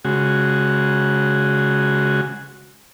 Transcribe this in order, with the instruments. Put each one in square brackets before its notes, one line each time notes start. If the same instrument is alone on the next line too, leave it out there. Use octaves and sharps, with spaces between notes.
[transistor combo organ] C#3 G#3 F#4